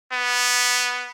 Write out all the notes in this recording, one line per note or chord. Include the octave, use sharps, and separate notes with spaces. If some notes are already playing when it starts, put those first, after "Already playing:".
B3